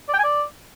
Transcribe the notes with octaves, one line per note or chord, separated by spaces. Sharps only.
D5
G5
G#5
D5